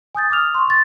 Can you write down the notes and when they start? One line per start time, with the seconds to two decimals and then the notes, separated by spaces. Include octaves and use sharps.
0.15 G#5 D#6 G6 A6
0.30 D6 D#6 F6 F7
0.54 C6 C#6
0.68 C6 A6